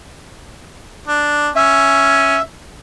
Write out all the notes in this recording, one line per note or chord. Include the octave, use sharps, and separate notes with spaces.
D4
C#4 E5